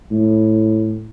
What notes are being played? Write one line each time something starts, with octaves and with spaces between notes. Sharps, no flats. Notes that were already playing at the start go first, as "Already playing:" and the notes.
A2